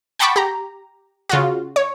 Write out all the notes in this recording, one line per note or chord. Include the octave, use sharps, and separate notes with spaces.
F#5 G5 A5 B5 C#6 D6
G4 A#5
C#3 F4 F#4
C#5